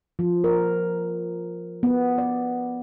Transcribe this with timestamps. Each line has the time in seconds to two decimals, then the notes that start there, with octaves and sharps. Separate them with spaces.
0.19 F3
0.44 A#4
1.83 B3
2.18 D5